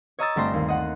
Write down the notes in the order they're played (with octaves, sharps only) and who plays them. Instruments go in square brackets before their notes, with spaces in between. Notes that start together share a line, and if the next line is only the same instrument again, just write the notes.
[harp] C#5 D#5 A#5 D#6 E6 A6
G1 G3 A3 C4 C6 A#6
D#2
D#5 F#5